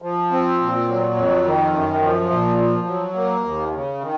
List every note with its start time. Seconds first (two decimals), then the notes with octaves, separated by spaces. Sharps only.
0.02 F3
0.32 C4
0.59 A#2
0.88 F#3
1.16 F2
1.45 D#3
1.73 F#2
2.01 F3
2.30 A#2
2.58 F3
2.87 F#3
3.15 A#3
3.44 D#2
3.72 C#3
4.01 D#3